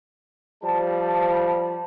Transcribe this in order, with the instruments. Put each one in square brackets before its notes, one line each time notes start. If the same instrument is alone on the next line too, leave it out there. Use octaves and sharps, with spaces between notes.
[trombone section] F3 G3 [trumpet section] A5